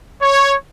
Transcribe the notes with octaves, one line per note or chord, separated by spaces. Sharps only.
C#5